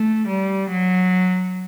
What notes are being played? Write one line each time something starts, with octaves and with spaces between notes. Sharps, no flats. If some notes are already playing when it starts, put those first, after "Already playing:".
Already playing: A3
G3
F#3